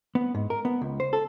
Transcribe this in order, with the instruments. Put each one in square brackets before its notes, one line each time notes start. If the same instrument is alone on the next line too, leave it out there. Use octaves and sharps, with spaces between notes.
[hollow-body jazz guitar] B3
G#2
A#4
B3
C#2
C5
A4